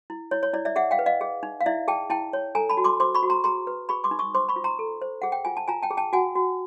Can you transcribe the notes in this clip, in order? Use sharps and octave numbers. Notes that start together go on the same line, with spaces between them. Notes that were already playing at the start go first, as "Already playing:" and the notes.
E4
E4 C#5
C#5
E4 D5
D5 E5
G#4 E5 F#5
F5 G5
B4
D#5 F5
G#4
D#4
F5
E4 D5 E5
G#4 G5 A5
E4 G5 A5
C#5
A4 G#5 A#5
A5 B5
F#4
C6 D6
C5 C6 D6
B5 C#6
F#4
A#5 C6
G#4 A#5 C6
B4
G#4 B5 C#6
C6 D6
D#4
C#6 D#6
C5 C6 D6
B5 C#6
F4
A#5 C6
A4
C5
G#4 F#5
G5
F4 G#5
A5
F4 G#5 A#5
G5 A5
G#4
G5 A5
F#4 F#5 G#5
F#4